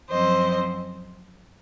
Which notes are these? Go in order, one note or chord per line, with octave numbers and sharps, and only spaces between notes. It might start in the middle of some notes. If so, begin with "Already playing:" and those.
F#2 F3 C4 C5 D#5